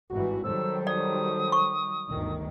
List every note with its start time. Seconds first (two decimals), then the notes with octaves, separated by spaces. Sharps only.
0.10 G#1 G2 E3 F#4
0.44 D#3 F#3 G3 A4 C5 E6
0.87 D5 D#6
1.52 C#6
2.07 G1 D2 D#3